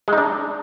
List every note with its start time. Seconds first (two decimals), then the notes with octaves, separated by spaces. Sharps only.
0.08 G#3
0.13 D#4
0.18 D4